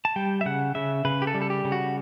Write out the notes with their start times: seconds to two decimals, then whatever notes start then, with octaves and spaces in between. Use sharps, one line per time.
0.05 A5
0.16 G3 G5
0.41 E5
0.46 C#3 F#5
0.75 C#3 E5
1.05 C#3 B4
1.22 G4
1.27 A4
1.34 G3
1.42 A4
1.50 G4
1.65 C#3
1.72 F#4